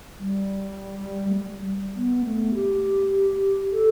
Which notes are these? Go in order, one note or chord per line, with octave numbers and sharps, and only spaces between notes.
G3
A3
G3
B3
A3
G4
A4